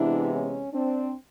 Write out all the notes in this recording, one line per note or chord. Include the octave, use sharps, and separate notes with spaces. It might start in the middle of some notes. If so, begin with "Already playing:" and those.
Already playing: C3 E3 G#3 B3 D4 E4
C#4
C4 D4